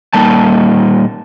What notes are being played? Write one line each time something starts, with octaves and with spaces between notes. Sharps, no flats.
A#2 G3 A#3 D#4 A5